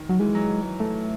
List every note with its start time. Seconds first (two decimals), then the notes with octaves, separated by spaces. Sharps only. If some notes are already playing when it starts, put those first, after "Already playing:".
Already playing: D#3
0.09 F#3
0.19 E3 G#3
0.35 F#3
0.80 A3